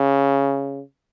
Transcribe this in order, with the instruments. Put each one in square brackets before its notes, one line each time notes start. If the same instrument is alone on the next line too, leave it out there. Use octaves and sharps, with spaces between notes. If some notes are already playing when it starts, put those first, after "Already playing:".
Already playing: [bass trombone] C#3